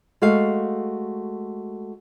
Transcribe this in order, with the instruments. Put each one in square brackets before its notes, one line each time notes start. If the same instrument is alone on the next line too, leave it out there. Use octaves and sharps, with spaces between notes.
[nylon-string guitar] G#3 A3 F#4 A4 F5